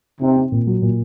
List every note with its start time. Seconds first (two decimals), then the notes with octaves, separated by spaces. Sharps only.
0.21 C3 D#4
0.37 C4
0.52 A#2
0.67 F#3
0.82 A#2